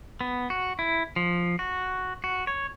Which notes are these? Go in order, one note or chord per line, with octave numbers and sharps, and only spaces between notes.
B3
F#4
E4
F3
F#4
F#4
C#5